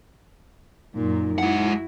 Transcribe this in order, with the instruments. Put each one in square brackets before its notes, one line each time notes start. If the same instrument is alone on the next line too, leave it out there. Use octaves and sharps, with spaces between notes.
[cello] F#2 A#2 [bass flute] D#4
[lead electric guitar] G#3 F#5 [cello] E4 F#4